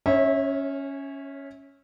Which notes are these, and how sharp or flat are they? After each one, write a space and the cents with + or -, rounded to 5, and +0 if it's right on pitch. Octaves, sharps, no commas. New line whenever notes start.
C#4 +0 C#5 -35 E5 -20